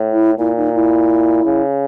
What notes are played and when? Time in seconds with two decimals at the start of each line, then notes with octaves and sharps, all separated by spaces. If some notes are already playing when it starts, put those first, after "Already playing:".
Already playing: A2
0.12 E4
0.38 A#2 E4
0.56 D#4
0.74 E4
1.45 C#3